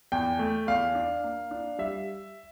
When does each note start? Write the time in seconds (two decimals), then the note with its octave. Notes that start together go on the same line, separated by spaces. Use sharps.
0.12 E2 G5
0.39 A3
0.67 E2 F5
0.95 D4
1.24 A#3
1.51 D4
1.79 G3 E5